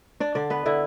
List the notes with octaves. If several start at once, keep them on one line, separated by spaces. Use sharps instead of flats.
D4 D5
D3 D5
B3 B4
D3 E4